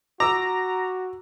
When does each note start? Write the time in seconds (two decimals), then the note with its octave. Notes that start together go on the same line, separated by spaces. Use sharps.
0.20 F#4 A#5 D6 E6